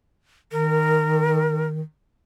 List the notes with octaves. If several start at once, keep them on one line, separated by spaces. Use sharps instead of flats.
D#3 A#4